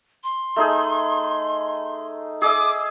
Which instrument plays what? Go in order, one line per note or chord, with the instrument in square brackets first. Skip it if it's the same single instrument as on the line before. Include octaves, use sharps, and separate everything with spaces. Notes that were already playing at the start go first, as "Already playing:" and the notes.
[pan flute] C6
[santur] A3 D#4 G#4
[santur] G#4 D#5 E5 [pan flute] D6